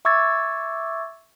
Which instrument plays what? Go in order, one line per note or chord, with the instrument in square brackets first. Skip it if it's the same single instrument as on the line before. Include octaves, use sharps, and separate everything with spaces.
[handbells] E5 C#6 D6 E6 G#6 A6